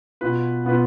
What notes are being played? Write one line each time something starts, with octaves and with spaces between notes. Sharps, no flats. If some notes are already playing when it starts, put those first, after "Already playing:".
B2 B3 F4 B4
B2 B3 F4 B4